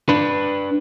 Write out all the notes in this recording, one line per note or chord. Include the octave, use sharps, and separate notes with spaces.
D4 B4